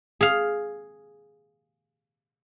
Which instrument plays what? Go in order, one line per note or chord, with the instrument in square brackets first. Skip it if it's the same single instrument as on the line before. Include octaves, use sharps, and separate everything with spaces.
[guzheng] G#4 F5